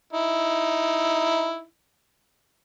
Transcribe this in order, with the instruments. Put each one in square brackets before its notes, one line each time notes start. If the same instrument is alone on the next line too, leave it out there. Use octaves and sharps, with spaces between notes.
[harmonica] D#4 E4